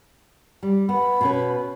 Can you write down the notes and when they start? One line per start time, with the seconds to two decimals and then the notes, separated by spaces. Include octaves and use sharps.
0.63 G3
0.89 B3 B5
1.21 B2 C#4 B4